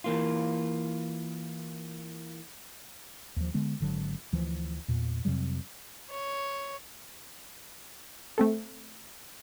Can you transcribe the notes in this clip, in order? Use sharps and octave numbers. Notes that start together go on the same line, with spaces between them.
E3 A#3 F4
D#2 F3
D3 G#3 B3
G#1 D3 F#3
D2 E3 F3
E2 A#2
F2 C3 F#3 G3
C#5
A3 C4 A4